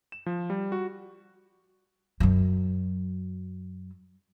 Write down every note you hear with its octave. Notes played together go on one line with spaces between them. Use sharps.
E7
F3
G3
F#4
F#2 F#3